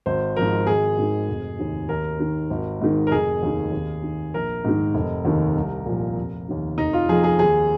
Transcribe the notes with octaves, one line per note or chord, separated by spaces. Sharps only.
G#1 C5
G#2 F3 A#4
G#1 G#4
G#2 D#3
F1
D#2 D#3
D#2 A#4
D#3
G#1
G#2 D#3
A#4
F1 G#4
D#2 D#3
D#2
D#3
A#1 A#4
G#2 D#3
F1
D#2 D#3
C2
A#2 F3
F1
D#2 D#3
F1 D#4
F4
F2 F3 G#4
G#4
D#2 G#4